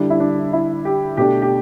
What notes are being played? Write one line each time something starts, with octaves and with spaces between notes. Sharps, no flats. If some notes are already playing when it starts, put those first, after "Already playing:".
Already playing: D3 G3 D4 E4
E4
D4
E4
G4
B2 A3 D4 G4
G4